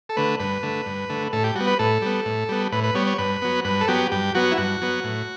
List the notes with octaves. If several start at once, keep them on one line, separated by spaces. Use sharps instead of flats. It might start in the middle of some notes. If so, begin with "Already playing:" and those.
A4
D3 A3 B4
G2 B4
D3 A3
G2
D3 A3
A2 A4
G4
G3 B3 F#4
B4
A2 A4
G3 B3
A2
G3 B3
A2 B4
B4
G3 B3 C#5
C#5
G2 B4
F#3 B3
G2 B4
A4
F#3 B3 G4
G2 G4
F#3 B3 F#4
E4
G2 F#4
F#3 B3
A2